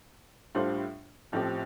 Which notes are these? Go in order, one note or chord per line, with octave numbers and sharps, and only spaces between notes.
A2 G3 D4 F4 C5
A1 A2 F3 C4 G4